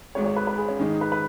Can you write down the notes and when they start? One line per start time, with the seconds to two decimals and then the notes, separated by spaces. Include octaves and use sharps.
0.15 G#1 G#2 G#3 C#5
0.26 C#5
0.36 B4
0.47 B4
0.58 G#4
0.68 C#4
0.79 G#2 D#3 G#3 D#4
0.90 D#4
1.01 B4
1.12 B4